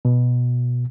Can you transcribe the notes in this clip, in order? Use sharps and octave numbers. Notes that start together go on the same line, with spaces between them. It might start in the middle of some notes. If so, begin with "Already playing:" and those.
B2